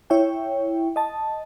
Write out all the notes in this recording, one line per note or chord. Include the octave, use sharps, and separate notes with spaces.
E4 C#5 E5 G5
D#5 A5